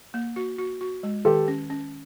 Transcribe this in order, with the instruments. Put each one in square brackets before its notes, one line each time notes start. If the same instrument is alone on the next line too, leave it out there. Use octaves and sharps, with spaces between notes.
[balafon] A#3
F#4
F#4
F#4
G#3
[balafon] D#3 [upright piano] G4 A4
[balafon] C#4
C#4